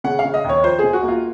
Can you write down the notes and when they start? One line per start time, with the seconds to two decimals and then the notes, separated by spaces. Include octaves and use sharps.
0.04 C#3 F#5
0.19 F5
0.24 C#3
0.34 D#5
0.44 D#2
0.49 C#5
0.64 F3 C5
0.79 C#2 G#4
0.93 F#4
1.03 A#3
1.08 F4